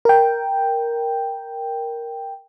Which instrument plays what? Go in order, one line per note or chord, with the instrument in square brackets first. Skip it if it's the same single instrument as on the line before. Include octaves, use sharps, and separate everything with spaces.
[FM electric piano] A#4 G5